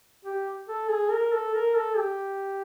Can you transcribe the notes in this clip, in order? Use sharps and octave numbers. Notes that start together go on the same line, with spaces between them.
G4
A4
G#4
A#4
A4
A#4
A4
G4